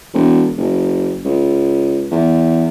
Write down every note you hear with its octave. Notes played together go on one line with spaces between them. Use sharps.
E1
F#1
C#2
E2